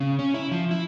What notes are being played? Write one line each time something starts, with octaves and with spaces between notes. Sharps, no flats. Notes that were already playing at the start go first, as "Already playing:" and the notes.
C#3
C#4
E4
F3
E4